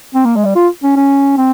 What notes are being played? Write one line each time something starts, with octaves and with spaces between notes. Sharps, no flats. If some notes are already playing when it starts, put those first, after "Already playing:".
C4
A#3
G#3
G3
F4
C#4
C#4
C4